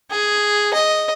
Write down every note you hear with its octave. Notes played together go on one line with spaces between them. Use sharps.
G#4
D#5